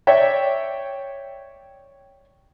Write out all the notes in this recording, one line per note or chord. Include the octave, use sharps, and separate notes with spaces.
C#5 D5 E5 G5